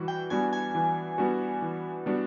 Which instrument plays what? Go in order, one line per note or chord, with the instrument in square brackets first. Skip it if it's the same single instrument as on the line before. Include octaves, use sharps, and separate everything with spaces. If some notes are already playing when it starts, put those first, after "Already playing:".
Already playing: [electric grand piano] E3 G3 F#4
[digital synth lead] G5
[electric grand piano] G3 B3 D4 F#4 [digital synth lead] G#5
[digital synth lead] G#5
[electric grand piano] E3
G3 B3 D4 F#4
E3
G3 B3 D4 F#4